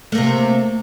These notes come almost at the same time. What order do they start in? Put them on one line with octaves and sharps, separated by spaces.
A3 A#3 C3